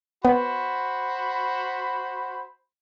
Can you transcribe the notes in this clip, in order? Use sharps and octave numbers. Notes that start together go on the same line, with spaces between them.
B3 F#4 C5 B5